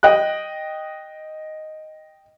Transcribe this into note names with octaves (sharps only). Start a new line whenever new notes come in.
D#5 G5 F#6